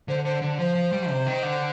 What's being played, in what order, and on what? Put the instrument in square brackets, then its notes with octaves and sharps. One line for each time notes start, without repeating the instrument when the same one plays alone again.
[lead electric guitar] D3 [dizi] C5
[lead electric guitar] D3 [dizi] C5
[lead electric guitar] D3
[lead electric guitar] F3 [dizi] C5
[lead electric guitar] F3
G3
C3
D#3
D3